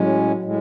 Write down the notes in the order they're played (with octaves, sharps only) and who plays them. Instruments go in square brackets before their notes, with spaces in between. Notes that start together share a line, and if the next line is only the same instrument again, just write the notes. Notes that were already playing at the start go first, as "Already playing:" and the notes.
Already playing: [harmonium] A2 G#3 C#4 [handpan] F#3
[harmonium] A2 G#3